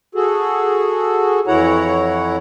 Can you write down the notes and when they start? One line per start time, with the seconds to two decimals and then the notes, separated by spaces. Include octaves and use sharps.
0.15 F#4 G#4 A4
1.47 F2 E3 E4 C#5 F#5 A#5